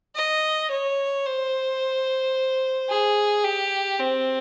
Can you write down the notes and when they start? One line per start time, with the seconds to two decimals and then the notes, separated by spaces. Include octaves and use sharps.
0.15 D#5
0.70 C#5
1.26 C5
2.90 G#4
3.44 G4
4.00 C4